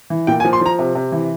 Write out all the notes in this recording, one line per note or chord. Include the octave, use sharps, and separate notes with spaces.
E3
A#2 G5
G#5
F3
C6
F3 A#5
C3
C3
E3